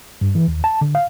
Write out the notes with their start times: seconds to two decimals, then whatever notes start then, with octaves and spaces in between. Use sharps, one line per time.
0.21 G2
0.35 E3
0.48 D#2
0.64 A5
0.81 D3
0.95 F5